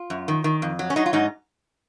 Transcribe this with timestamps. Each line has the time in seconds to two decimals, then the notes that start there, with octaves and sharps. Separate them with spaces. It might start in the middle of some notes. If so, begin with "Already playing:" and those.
Already playing: F4
0.10 F#2
0.28 D#3
0.44 D#3
0.62 F2
0.79 F#3
0.90 C#4
0.96 F#3 D#4
1.06 F4
1.13 G#2 D#4